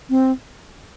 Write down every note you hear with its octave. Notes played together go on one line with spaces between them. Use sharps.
C4